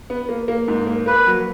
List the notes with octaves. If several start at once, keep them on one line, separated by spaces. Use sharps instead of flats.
B3
A#3
A#3
G#2
A#3
A#3 B4
F#3